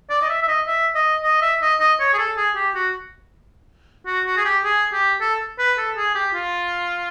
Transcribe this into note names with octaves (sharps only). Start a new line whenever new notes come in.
D5
D#5
E5
E5
D#5
E5
D#5
D#5
E5
D#5
D#5
C#5
G#4
A4
G#4
G4
F#4
F#4
F#4
G#4
G4
G#4
G4
A4
B4
A4
G#4
G4
F4